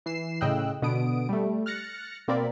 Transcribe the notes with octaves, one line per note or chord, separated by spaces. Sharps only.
E3 C7 E7
A2 C#3 D#5 G5 E6 F#6
B2 D3 B3 D#6 D7
G3 A3
F6 F#6 A6 A#6 C#7
B2 A#3 C4 A#4 D5 B5